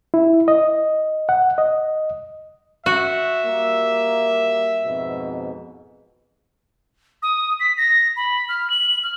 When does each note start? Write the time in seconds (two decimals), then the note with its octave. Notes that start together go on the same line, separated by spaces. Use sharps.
0.14 E4
0.48 D#5
1.29 F#5
1.58 D#5
2.86 F#4 E5
3.44 G3 A#3
4.85 F2 G#2 B2
7.23 D#6
7.60 B6
7.77 A#6
8.17 B5
8.49 F6
8.70 F#7
9.03 F6